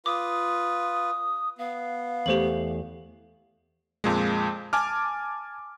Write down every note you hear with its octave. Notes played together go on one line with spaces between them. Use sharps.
F4 B4 D6 D#6
B3 F5
E2 A3 G4 C5 F#7
F2 A#2 G#3
G#5 A5 D6 F6